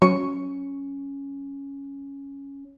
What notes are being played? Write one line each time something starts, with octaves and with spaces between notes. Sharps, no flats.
F#3 C#4 C#6